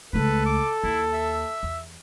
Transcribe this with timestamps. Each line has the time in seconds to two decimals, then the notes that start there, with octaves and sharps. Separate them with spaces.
0.13 C#2 A3 A4 B4
0.46 D6
0.84 D#2 E4
1.13 E5
1.63 E2